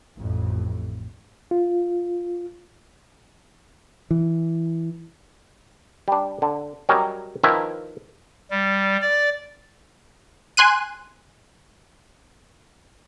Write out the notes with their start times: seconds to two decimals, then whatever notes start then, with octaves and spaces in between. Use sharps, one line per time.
0.17 A1 F2 A2
1.51 F4
4.11 E3
6.08 G3 D4
6.42 D3
6.89 F#3 G3 C#4 A#4 D#5
7.43 D#3 F3 E4 A#4 B4 E5
8.51 G3
9.02 D5
10.57 G#5 C6 F#6 D#7